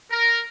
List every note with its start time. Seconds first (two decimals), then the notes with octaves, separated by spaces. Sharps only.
0.10 A#4